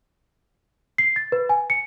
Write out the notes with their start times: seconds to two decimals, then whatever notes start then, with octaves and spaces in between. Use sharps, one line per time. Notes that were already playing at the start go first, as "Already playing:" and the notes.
0.98 C7
1.16 A6
1.32 B4
1.49 G#5
1.70 C#7